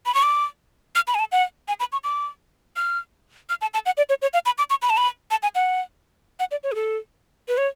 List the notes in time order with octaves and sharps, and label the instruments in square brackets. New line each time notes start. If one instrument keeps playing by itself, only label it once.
[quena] B5
C#6
D6
F6
B5
G#5
A5
F#5
G#5
B5
C#6
D6
F6
F6
A5
A5
F#5
D5
C#5
C#5
F5
B5
D6
C#6
B5
A5
B5
A5
G#5
F#5
F#5
D5
C#5
G#4
A4
B4
C#5